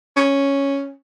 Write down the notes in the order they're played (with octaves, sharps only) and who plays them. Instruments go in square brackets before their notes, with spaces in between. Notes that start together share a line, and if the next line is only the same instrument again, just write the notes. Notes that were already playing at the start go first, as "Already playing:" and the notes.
[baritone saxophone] C#4